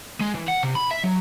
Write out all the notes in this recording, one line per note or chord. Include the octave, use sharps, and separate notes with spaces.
G#3
E3
F#5
C3
B5
E5
F#3